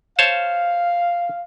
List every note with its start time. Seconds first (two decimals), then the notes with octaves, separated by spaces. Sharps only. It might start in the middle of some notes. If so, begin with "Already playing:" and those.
0.19 C5 C#5 F5 A5